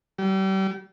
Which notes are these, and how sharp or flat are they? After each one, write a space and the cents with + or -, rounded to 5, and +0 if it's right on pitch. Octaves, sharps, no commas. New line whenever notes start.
G3 -35